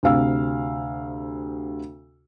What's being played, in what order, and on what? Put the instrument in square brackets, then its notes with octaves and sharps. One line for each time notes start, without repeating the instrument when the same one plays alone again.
[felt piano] D2 C3 F5 E6